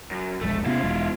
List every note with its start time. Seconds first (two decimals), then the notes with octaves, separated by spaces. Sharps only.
0.11 F#2
0.41 E1 A#1 G#3 A3
0.66 C3 B3 C#4 E4 F4
0.83 E1 G#3